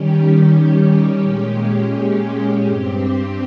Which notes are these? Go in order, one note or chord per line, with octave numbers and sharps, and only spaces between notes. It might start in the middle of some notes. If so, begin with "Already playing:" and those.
Already playing: D#3 G3 C#4 G4
A#2 G#3 C#4 G4
G2 G3 C4 G4